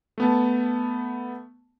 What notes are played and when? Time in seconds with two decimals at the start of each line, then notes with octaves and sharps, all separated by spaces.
0.18 A3 B3 A5